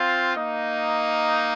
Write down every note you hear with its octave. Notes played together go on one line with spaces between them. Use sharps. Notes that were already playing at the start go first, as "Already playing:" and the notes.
Already playing: C4 F4
A#3 D#4